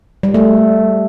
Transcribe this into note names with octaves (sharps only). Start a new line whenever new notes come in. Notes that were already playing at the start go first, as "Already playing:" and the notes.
G3
A3